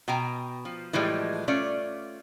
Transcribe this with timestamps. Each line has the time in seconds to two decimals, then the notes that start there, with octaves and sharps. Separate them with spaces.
0.08 B2 G5 G#5 A#5
0.65 F3
0.93 A2 E3 F3 G3 G#3
1.48 A3 C#4 F4 D5